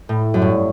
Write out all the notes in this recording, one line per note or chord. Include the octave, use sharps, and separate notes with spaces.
A2
F#2
G2